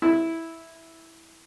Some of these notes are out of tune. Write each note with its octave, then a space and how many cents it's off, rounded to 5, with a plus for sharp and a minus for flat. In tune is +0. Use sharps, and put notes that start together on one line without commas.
E4 -10